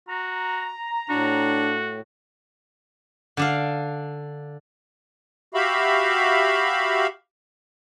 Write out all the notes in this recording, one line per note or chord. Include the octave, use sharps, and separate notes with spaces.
F#4 A#5
A2 D4 F#4
D3 D4 F5
F#4 G4 E5 F5 B5